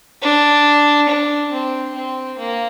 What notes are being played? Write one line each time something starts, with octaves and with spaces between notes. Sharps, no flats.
D4
D4
C4
C4
A#3